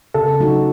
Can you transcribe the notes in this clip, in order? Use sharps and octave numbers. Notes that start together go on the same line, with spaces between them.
C#3 A4
F#3 A3 D#4 F#4